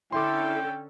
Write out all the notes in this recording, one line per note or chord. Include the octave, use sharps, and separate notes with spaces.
D3 C#4 E4 A4 G5 C6 D6